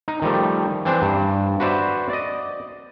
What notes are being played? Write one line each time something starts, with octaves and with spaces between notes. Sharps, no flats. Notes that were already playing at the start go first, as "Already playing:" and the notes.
D#4
D#3 F3 G3 A3
E3 C4 D4 C5
G2
F#4 B4 C5 D5 E5
D5 D#5